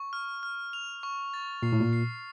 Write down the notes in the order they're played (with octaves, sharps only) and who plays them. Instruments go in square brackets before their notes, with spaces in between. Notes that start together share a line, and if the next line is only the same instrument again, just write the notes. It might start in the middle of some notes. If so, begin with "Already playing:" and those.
Already playing: [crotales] C#6
F6
F6
F7
C#6
A6
[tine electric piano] A#2 [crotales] C7
[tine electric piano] A2
A#2
[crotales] C7